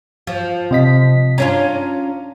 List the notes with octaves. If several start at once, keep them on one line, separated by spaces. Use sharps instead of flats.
F3
C3 D#5 B6
C#4 D4 F4 A#5